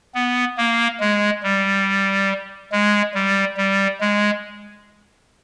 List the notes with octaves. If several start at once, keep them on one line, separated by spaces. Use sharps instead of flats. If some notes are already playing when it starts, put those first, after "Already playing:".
B3
A#3
G#3
G3
G#3
G3
G3
G#3